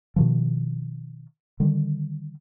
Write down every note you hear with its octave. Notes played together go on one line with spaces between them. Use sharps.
B2 D#3 F3
D3 D#3 G3